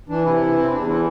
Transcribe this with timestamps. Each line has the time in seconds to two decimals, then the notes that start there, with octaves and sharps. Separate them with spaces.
0.09 E3 D4
0.24 C3 E4
0.41 E3
0.57 C4
0.72 E2 D4
0.87 E3 E4